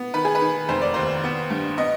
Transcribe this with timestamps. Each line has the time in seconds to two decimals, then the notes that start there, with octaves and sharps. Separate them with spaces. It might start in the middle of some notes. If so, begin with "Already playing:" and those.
Already playing: B3
0.14 D#3 B4
0.25 G#4
0.35 B4
0.41 D#3
0.69 F1 C5
0.81 D5
0.94 D#2 C5
1.24 B3
1.50 G2
1.78 B3 D#5